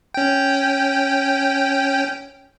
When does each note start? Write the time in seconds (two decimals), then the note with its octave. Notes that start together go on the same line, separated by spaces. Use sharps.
0.14 C#4 G5